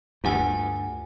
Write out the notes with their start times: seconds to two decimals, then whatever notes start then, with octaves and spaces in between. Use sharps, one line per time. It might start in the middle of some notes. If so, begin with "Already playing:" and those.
0.24 D2 G2 F4 F#5 G#5